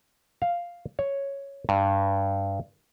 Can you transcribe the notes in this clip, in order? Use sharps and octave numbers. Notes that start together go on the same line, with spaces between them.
F5
C#5
G2